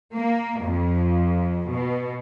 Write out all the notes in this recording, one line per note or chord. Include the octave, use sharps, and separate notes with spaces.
A#3
F2
B2